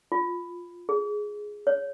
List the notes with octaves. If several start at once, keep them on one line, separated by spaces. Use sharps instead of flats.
F4
G#4
C#5